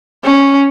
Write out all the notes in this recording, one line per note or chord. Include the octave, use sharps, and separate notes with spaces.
C#4